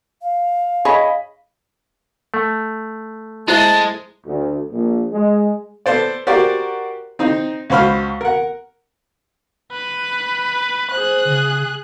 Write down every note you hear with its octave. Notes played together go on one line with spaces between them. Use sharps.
F5
G#4 C#5 D#5 B5
A3
G#3 E4 C5 E5 A5
D2
A#1
G#3
B3 A4 C5 D5
F#4 G4 A#4 C5 D5
C4 D#4
C#2 F#4 C5 B5 F6
A#4 F#5
B4
G#4 C5 F#6
C#3